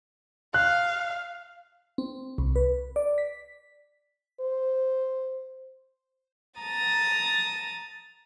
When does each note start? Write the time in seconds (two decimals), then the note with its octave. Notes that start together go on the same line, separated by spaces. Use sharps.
0.54 F5 F#6
1.98 C4
2.38 C2
2.56 B4
2.96 D5
3.18 B6
4.40 C5
6.60 A5 A#5 D#6 A6